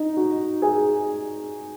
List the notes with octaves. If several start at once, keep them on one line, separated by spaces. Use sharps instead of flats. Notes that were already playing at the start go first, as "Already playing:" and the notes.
Already playing: D#4
F#4
G#4